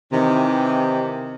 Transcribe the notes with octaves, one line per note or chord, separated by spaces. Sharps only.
C3 D#3 E3